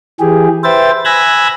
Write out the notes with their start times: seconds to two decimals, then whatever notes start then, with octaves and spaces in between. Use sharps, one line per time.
0.20 E3 G4 G#4
0.64 B4 C5 E5 G5 A6
1.05 G#5 B5 E6 F#6 G#6 A#6